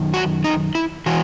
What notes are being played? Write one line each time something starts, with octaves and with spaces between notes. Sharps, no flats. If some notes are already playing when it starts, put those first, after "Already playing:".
Already playing: F#2 D#3
F#4
D#4
E4
E3 F#4